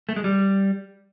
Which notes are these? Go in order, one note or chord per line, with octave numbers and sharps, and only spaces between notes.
A3
G#3
G3